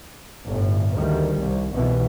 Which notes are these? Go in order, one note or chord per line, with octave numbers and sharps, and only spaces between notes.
G1 A2
D2 D#3 G3
C2
C2 B2 E3